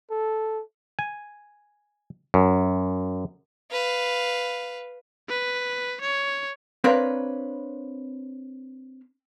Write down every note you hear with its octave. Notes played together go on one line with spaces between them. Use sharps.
A4
G#5
F#2
B4 F5
B4
C#5
C4 D4 A#4 B4 C#5 F5